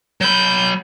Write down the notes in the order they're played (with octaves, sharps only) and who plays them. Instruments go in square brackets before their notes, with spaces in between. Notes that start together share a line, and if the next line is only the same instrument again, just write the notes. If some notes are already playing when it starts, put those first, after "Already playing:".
[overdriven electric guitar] F#3 B5 [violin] G6